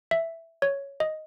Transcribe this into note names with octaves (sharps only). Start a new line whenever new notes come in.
E5
C#5
D#5